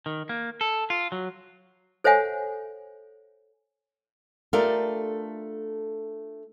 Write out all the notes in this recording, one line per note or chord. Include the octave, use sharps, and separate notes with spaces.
D#3
A#3
A4
F4
F#3
A4 C5 C#5 E5 F#5 G#5
A3 D4 F4 G4 A4 A#4